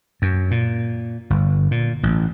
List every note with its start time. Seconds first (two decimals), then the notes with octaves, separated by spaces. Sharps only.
0.22 F#2
0.51 A#2
1.30 G1
1.71 A#2
2.03 A1